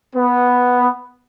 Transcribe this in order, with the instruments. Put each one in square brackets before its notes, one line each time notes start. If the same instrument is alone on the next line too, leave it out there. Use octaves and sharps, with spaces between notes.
[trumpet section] B3